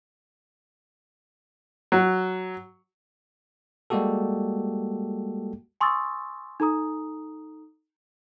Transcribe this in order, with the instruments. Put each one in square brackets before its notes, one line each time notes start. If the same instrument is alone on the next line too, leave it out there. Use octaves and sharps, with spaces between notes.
[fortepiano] F#3
[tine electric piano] G3 G#3 A#3 F#4 G4 A4
[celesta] G#5 C6 C#6 D#6 E6 A6
D#4 A4 A#5 D#6